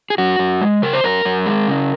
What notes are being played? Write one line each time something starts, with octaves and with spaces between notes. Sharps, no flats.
G#4
F#2 F#4
F#2
G#3
C#3 A#4
C5
F#2 A#4
F#2
G#3
C#3